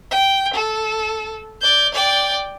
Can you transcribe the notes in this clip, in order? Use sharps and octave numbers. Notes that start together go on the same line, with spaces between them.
G5
A4
D5 G6
D5 G5